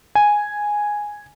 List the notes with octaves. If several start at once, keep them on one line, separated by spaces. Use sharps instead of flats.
G#5